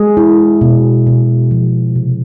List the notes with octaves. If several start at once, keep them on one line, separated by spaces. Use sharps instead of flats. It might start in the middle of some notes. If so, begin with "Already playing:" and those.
Already playing: G#3 G#4
E4
B2
B2
F3
C3